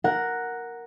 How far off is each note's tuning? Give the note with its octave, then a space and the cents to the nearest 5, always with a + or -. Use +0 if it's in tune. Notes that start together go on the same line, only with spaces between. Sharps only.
A#4 +0 F#5 +0